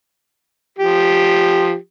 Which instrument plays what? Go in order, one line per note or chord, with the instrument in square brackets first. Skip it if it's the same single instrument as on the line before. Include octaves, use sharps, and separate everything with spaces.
[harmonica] F3 G4